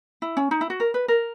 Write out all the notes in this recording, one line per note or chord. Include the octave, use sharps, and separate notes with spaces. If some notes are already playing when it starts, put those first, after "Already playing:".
E4
C#4
D#4
E4
F#4
A#4
B4
A#4